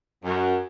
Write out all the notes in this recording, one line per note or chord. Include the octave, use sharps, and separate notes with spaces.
F#2